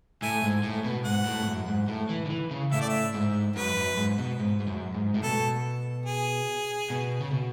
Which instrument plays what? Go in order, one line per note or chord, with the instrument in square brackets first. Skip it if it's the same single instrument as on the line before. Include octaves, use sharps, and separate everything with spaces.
[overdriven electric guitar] A2 [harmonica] E5 G#5
[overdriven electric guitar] G#2
A2
B2
[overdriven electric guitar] G#2 [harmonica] F#5
[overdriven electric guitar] A2
G#2
F#2
G#2
A2
E3
D3
E3
C#3
[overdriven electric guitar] A2 [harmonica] E5
[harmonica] D5
E5
[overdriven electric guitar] G#2
[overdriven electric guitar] F#2 [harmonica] B4
[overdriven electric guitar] F#2
G#2
B2
G#2
G#2
F#2
G#2
A2
[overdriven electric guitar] B2 [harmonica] A4
[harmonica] G#4
[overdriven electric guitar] B2
C#3
B2